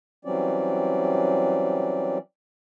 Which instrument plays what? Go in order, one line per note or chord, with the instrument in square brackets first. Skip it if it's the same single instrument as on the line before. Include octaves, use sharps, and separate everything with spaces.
[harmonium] E3 F#3 G3 C4 C#4 D5